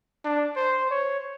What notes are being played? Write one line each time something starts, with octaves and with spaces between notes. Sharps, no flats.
D4
C5
C#5